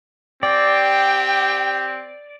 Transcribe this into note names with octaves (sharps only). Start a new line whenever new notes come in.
C4 G4 D5 G5